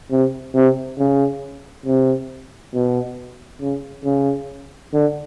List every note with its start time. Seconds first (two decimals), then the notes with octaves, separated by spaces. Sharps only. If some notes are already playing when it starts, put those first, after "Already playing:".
0.11 C3
0.55 C3
0.99 C#3
1.86 C3
2.74 B2
3.61 C#3
4.05 C#3
4.93 D3